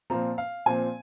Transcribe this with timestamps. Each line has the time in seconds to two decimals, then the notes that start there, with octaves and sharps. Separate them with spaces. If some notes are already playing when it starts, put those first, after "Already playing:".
0.10 A#2 F3 C4 A#5
0.38 F5
0.66 A#2 F3 C4 G#5